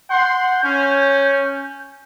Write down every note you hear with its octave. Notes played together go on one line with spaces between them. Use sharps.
F#5 C6 G6
C#4